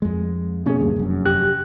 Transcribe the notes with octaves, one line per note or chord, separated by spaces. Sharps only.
F2 G#3
B2 A#3 C#4 G#4
D2 G2
F1 F#2
G#1 G4 F#6